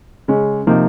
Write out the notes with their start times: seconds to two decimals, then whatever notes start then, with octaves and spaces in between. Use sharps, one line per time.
0.28 C#3 G#3 C#4
0.67 C3 F3 A#3 D#4